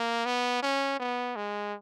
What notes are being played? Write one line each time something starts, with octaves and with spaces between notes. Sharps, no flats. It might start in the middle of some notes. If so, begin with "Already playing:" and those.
Already playing: A#3
B3
C#4
B3
G#3